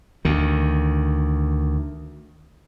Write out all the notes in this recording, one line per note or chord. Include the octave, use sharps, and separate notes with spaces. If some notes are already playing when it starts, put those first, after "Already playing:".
D2 D#3